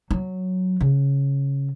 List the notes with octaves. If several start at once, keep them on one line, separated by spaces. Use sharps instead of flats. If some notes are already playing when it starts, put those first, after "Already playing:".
F#3
C#3